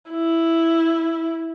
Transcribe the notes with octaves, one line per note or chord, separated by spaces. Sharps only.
E4